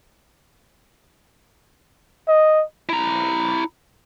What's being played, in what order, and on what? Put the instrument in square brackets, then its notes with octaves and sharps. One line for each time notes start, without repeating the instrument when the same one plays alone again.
[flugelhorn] D#5
[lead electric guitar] E4 A#5